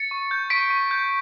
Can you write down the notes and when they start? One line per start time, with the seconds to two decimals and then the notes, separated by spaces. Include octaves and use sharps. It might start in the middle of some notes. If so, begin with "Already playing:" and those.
Already playing: A6 C#7
0.11 C#6
0.31 G6
0.50 C#6 B6 D7
0.70 C#6
0.91 G6